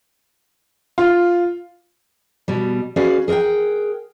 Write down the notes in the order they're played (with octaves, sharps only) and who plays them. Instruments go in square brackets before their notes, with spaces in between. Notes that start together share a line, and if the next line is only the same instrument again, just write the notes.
[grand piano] F4
[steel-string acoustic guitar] B2 G3
C#4 F#4 G#4 B4 D5 F5
G#4 A#4 D#5 F#5 G5